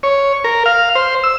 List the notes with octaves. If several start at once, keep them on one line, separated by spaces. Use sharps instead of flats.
C#5
A#4
F5
C5
E6